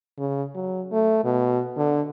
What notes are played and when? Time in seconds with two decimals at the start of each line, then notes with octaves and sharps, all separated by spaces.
0.19 C#3
0.55 F#3
0.92 A3
1.24 B2
1.77 D3